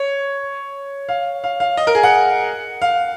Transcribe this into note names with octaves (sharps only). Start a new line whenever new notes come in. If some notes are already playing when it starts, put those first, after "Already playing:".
Already playing: C#5
F5
F5
F5
D#5
A#4
G#4
F#5
F5